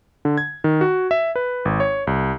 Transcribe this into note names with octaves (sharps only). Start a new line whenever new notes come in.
D3
G#6
D#3
F#4
E5
B4
G#1
C#5
C2